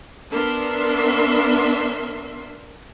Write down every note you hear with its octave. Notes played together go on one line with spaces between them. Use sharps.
B3 D4 A#4 E5 C6